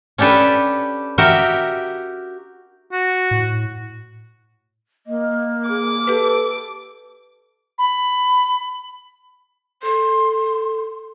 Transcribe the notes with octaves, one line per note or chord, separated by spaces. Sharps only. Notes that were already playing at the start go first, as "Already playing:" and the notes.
C#4 D4 G4 A4 B4
F#4 G4 A#4 E5
F#4
A2
A#3 D#5
G#4 D6
G4 A4 B4
B5
A4 C6